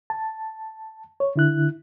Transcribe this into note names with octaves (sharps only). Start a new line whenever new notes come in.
A5
C#5
D3 E4 F#6